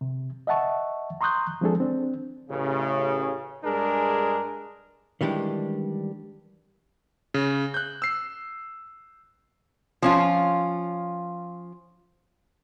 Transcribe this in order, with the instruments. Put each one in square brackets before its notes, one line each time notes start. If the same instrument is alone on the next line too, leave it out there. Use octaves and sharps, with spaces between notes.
[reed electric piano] C3
D#5 E5 F#5 A5 C#6
A#5 C6 C#6 D#6 F#6 G6
F3 G#3 C4 D4 G#4 A4
C4 D4
[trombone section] A1 C#3
G2 G#3 D4 G#4 A#4
[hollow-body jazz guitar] D#3 E3 G3 G#3 D4
[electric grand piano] C#3
F#6 G6
E6 C7
[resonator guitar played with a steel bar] F3 C#4 F4